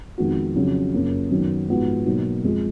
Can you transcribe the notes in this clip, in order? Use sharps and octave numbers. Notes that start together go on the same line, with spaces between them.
F2 D#3 G#3 B3 F#4
F2 C#3 F#3
F#2 C#3 F3 A#3 C#4
F#2 D#3 F#3 B3
G#2 F3 B3 F#4
B2 F#3 A#3 D#4
F2 F3 G#3